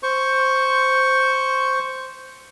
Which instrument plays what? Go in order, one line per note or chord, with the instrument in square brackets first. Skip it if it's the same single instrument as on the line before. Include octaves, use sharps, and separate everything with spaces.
[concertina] C5 C#6